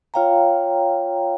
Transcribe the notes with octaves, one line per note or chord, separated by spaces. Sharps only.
F4 C#5 F5 G5 A#5